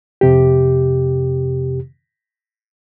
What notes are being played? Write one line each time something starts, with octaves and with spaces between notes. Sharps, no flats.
F2 C3 G4